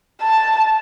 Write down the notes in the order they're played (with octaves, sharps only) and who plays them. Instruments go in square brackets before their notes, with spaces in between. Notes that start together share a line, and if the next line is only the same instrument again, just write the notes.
[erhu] A5